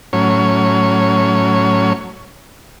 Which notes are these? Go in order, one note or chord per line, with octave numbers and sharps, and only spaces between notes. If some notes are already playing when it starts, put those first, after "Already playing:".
A2 F#3 C#4 C#5